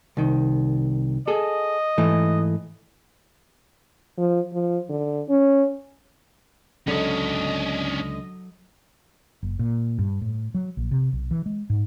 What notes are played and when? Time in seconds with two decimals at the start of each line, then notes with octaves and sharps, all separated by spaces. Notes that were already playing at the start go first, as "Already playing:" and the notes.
0.17 C2 D#3
1.28 G#4 A4 D#5
1.98 G#2 E3 A3
4.18 F3
4.54 F3
4.89 D3
5.29 C#4
6.87 C#2 D3 F#3 C#4 D4 A4 D#5
9.43 F#1
9.59 A#2
9.99 G2
10.21 A2
10.54 F#3
10.77 A#1
10.91 C3
11.13 B1
11.31 E3
11.46 G#3
11.70 G#2